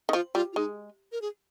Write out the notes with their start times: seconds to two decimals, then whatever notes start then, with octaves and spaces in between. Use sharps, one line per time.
0.09 D#3
0.13 F3 F4
0.35 G3 F4
0.53 F4
0.56 G#3 D#4
1.12 A#4
1.22 G#4